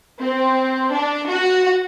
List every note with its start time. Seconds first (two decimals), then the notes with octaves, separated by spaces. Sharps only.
0.20 C4
0.93 D4
1.29 F#4